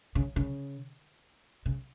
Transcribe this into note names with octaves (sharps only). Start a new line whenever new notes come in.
C#3
C#3
C#3